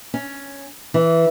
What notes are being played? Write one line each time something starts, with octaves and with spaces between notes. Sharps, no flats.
C#4
E3